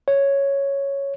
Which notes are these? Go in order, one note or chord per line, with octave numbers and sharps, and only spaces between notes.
C#5